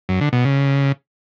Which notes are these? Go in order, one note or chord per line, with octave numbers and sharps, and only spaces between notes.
F#2
D3
B2
C#3